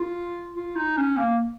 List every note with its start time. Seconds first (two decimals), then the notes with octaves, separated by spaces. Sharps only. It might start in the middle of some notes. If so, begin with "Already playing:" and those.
Already playing: F4
0.55 F4
0.76 D#4
0.97 C#4
1.17 A#3